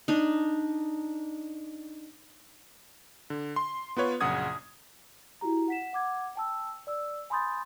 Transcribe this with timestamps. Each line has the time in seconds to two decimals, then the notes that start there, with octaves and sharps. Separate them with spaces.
0.08 D4 D#4
3.30 D3
3.56 C6
3.97 B3 F4 B4 C#5
4.21 A#1 F#2 C#3 F#5 D#6 G#6
5.41 E4 F#4 G4 A#5
5.68 F#5 B6 E7
5.93 F#5 D6 G#6
6.36 G5 A5 E6
6.87 D5 E6
7.30 G#5 B5 C6 D#6 G6 A6